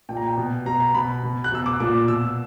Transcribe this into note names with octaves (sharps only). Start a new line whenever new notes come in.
A#2 G5
A#5
G5
B2
B2 A#5
A#5
B2 B5
B2
F#6
B2 E6
D6
A#2 D6
B2 E6